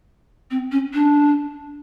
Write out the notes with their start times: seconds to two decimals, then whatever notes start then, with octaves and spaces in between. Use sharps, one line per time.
0.51 C4
0.72 C#4
0.93 D4